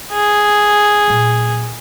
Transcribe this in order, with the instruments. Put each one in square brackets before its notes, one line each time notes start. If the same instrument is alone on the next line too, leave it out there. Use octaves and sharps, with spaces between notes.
[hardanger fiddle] G#4
[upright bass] A#2 F#3